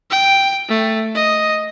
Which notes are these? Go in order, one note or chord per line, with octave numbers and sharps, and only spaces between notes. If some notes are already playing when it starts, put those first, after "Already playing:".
G5
A3
D#5